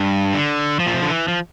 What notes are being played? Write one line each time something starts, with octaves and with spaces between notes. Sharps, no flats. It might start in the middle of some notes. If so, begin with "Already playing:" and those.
Already playing: G2
D3
F3
A#2
C3
D3
E3
F3